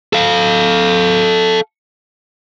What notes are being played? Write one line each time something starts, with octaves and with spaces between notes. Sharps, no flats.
A4 F5